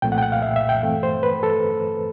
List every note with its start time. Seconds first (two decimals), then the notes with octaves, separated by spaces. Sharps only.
0.02 C2 A#2 F3 A3 C4 G5
0.12 F#5
0.18 G5
0.23 F#5
0.32 F5
0.42 E5
0.56 E5
0.69 G5
0.83 G2 E3 A3 C4
1.03 C5
1.23 B4
1.43 A4